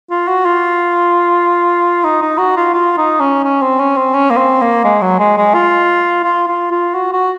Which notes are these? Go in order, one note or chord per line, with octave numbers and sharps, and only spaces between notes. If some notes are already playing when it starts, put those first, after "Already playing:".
F4
F#4
F4
D#4
D#4
F#4
F4
F4
D#4
C#4
C#4
C4
C#4
C4
C#4
A#3
C4
A#3
G#3
F#3
G#3
G#3
F4
F4
F4
F4
F#4
F#4